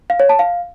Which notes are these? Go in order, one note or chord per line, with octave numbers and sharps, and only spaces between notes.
F5
C#5
A5
F5